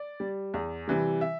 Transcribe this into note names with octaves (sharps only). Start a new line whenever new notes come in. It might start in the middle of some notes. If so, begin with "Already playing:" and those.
Already playing: D5
G3
E2
C3 E3 G3
E5